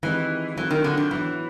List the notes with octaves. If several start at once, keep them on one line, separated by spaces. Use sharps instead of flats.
D#3 E3 G#3 C4 D#4 G4
E3 F#3 A3 C4 F4
D#3
D3
D#3
E3 F#3 B3 E4